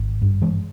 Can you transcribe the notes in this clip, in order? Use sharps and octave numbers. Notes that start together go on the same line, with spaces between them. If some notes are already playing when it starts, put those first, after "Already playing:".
Already playing: G#1
G2
E3 G#3